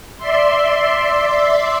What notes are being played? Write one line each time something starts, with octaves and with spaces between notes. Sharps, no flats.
D5 E5 C6